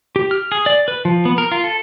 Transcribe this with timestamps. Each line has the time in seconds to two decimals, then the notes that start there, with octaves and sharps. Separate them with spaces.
0.16 G4
0.31 F6
0.52 G#4
0.66 D5
0.88 B4
1.05 F3
1.25 B3
1.38 A#4
1.52 F4
1.64 A4